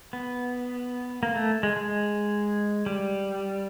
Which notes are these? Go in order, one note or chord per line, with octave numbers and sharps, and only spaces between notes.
B3
A#3
A3
G#3
G#3
G3